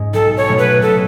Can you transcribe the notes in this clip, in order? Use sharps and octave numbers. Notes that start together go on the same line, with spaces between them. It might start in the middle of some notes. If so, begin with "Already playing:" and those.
Already playing: G#2 G#3 C#4
B1 A4
C#5
B2 F#3 A3 C#4
B4
B2 A4